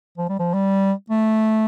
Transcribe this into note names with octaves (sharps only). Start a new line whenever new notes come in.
F3
G3
F3
G3
A3